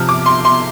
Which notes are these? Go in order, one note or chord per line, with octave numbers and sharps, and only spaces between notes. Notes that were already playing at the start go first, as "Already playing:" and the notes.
Already playing: C3 F3 F6
D6
C6
C6